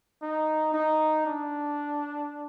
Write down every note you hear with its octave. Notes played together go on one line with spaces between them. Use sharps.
D#4
D#4
D4